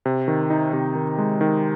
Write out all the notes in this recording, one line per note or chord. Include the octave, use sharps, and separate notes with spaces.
C3
D#3
D#4
C3
D#3
G#3
D#3